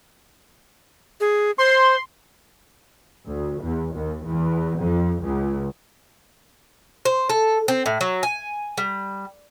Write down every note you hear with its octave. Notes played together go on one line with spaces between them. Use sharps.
G#4
C5 C6
D2
E2
D#2
E2
F2
C#2
C5
A4
C4
A2
F#3
G#5
G3